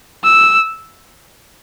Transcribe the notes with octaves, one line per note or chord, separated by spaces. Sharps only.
E6